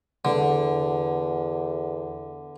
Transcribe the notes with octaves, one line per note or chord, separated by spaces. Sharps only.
E2 D3